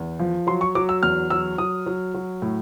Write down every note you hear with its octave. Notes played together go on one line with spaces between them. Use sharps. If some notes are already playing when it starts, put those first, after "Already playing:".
Already playing: E2
F3
F#3 C6
C#6
F#3 D6
E6
E2 F6
F#3 E6
F#3 D#6
F#3
F#3
A2